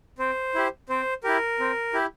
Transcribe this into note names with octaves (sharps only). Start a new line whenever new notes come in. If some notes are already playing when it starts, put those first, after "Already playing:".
C4 C5
E4 G4
C4 C5
E4 G4 A#4
C4
E4 G4